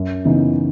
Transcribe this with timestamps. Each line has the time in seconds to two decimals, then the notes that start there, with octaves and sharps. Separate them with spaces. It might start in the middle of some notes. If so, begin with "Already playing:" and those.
Already playing: F#2
0.25 C#3 E3 B3 D#4